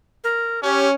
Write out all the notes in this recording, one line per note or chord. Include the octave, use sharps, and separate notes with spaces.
A#4
C#4 G4